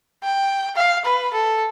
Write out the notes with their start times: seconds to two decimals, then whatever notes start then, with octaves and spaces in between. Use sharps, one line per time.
0.24 G5
0.76 F5
1.05 B4
1.33 A4